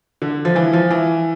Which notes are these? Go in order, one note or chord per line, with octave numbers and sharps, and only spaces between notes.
D3
F3
E3
F3
E3